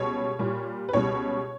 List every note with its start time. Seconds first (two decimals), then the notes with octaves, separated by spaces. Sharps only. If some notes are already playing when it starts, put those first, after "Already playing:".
Already playing: C#2 B2 G3 C#5
0.39 A#2 G3
0.89 B4
0.93 C#2 B2 G3 C#5